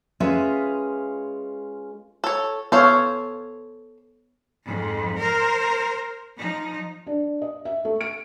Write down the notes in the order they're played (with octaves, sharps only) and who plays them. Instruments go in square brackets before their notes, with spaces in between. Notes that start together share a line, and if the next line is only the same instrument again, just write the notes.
[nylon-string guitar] G#3 C#4 F4 G#4 B4 E5
[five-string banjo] A4 C#5
[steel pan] B3 C#5 [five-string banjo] A4 C5 F5
[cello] F2 G#2
A#4 C5
F3 D#4
[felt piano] D4
D#5
E5
A3
D7